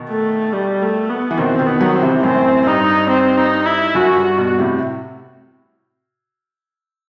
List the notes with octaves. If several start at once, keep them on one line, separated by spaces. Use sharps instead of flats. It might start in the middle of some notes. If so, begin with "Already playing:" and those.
Already playing: B2 D#3
A3
G3
A3
B3
E3
B2 D#3 C4
B2 D#3
B3
D#3 F#3
C4
C3 E3
F#2 A2 C4
G2 D#4
C4
D#4
E4
F#2 F#4
G2
F#4
G2 B2
A2 C3